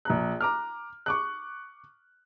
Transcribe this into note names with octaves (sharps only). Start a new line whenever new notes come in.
A#1 A#5 F#6
A#5 D6 F6
C#6 D6 F#6